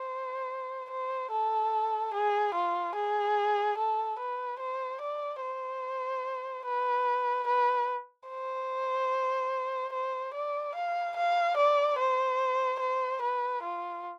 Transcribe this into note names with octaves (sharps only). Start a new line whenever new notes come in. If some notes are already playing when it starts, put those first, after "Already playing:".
Already playing: C5
C5
A4
G#4
F4
G#4
A4
B4
C5
D5
C5
B4
B4
C5
C5
D5
F5
F5
D5
C5
C5
B4
F4